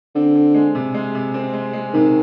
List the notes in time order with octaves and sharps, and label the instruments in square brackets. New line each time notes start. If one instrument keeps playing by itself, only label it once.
[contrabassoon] D3 [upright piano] C4
[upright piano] C4
G#3
C3
G#3
C3
C4
G#3
G#3
[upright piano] C3 [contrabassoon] D#3